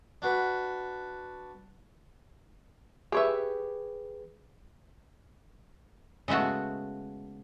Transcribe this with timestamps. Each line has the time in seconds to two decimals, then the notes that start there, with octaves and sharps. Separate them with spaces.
0.22 D4 F#4 B4
3.12 G4 G#4 B4 C#5 E5
6.28 C#3 G#3 A3 B3 F#4